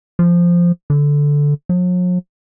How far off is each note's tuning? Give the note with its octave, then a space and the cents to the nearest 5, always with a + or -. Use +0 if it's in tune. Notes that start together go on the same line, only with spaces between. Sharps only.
F3 -5
D3 -10
F#3 -45